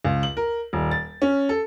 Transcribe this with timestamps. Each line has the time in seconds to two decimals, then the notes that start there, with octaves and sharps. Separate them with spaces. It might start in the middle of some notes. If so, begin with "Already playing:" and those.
0.05 C#2
0.23 F#7
0.37 A#4
0.73 D#1
0.91 A6
1.22 C#4
1.49 A4